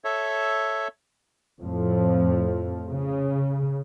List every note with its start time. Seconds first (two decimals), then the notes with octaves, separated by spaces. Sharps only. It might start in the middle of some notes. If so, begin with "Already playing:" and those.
0.05 A4 C#5 E5
1.62 F2 A2 F3
2.89 C#3